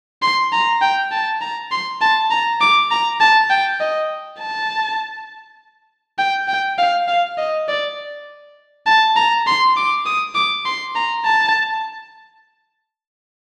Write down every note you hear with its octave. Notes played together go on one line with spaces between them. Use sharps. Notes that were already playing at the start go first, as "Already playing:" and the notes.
C6
A#5
G5
A5
A#5
C6
A5
A#5
D6
A#5
A5
G5
D#5
A5
G5
G5
F5
F5
D#5
D5
A5
A#5
C6
D6
D#6
D6
C6
A#5
A5